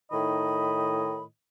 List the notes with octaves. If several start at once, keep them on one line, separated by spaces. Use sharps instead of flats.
A2 D#3 D#4 D#5 B5